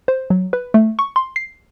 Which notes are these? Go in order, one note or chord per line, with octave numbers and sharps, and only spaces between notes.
C5
F#3
B4
A3
C#6
C6
C7